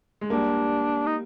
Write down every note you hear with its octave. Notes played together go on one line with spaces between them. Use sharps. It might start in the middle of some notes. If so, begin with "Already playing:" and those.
G#3
G3 A#3 D4
D#4